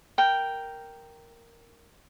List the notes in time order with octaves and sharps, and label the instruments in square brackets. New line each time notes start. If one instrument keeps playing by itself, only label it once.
[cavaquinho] A#4 G5